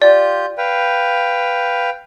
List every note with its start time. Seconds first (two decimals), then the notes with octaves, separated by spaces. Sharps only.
0.02 F4 G4 D5 G6
0.58 B4 F5 G5